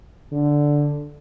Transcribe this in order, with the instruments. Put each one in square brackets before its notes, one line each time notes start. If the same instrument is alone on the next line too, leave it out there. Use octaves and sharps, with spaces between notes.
[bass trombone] D3